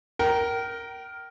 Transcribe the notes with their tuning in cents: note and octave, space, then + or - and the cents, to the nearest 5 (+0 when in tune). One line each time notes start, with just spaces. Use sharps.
A#4 +5 G5 -30